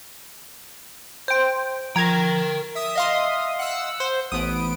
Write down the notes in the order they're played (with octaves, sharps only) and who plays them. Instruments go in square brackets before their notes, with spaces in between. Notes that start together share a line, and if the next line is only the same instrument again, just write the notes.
[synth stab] C5 G5
[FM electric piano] F3 [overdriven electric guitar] A#4 G5 [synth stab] A#5 G#6
[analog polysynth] E5 D#6
[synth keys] D#5 F5 C6
[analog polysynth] F#5 E6
[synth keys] C5
[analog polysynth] A1 B3 D7 [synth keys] D#6